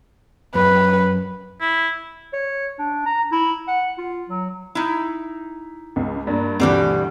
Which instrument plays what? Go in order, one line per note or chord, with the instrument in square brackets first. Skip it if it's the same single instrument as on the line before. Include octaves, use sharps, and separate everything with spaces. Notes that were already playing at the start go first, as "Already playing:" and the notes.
[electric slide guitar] F#2 [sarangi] B4
[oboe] E4
[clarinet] C#5
D4
A#5
E4
F#5
F4
F#3
[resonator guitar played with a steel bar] D#4 E4
[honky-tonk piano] C#2
G2 A#3
[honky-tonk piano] D2 G2 E3 [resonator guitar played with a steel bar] B2 G3 C4